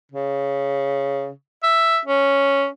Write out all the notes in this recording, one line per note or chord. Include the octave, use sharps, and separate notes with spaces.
C#3
E5
C#4